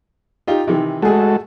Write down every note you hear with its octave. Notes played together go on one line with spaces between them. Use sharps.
D#4 F4 G4
C3 D#3 E3
G#3 A3 F#4 G#4 A4